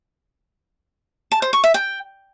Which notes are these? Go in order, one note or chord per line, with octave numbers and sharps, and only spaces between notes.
A5
C5
C#6
E5
G5